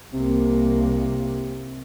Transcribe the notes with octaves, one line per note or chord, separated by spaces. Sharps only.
C2 C3 A#3